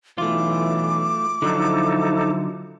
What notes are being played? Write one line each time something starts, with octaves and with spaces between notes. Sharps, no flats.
B1 E3 A3 F4 D6
D3 F3 F#3 D#4 E4 A4